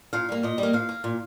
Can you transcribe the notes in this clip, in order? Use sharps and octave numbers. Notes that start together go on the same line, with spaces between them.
A#2 F5
G3 A#3
A#2 D#5
G3
A#3
A#2 F5
A#3
A#2